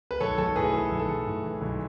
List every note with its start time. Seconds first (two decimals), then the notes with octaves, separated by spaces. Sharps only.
0.11 B4
0.20 B1 A4 C#5
0.38 B1 A4
0.56 A2 G#4 B4
0.73 E3 A4
0.91 B1
0.99 A4
1.08 B1
1.26 A2
1.44 E3
1.61 B1